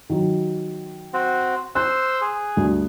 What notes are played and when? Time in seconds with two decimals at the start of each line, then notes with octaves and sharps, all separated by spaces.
0.10 D#3 F#3
1.14 C4 F#4
1.75 C5 E6 F#6
2.21 G#4
2.57 D2 G2